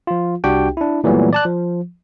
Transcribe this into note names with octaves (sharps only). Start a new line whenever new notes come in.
F3 F4
C2 D4 F#4 G4 G5
D4 E4
A#2 E3 F#3 G3 A3 B3
D5 A5 F#6
F3